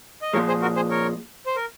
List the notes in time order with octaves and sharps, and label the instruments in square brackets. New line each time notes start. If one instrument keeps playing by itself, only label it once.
[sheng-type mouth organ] D#5
[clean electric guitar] A#2 F3 G#3 [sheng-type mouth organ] A#4 C#5
[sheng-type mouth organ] G#4 C5
F#4 A#4
G#4 C5
A#4 C#5
C5
A#4